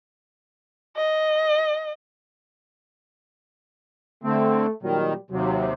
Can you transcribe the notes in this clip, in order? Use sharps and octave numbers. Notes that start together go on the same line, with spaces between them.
D#5
D3 A3 C4
A#2 D#3 F#3 G3
D#2 C3 F#3